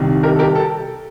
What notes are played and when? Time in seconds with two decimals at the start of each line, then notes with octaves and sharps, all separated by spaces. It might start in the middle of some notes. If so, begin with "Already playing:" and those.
Already playing: C2 C3 D#3
0.23 G4 A#4
0.35 A4
0.39 G4 A#4
0.55 A4